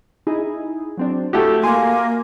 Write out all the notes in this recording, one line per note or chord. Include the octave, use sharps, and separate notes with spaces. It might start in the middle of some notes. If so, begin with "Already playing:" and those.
D#4 E4 G#4
F#3 C4 D4
A3 E4 F#4 G4
A#3 G#5 C6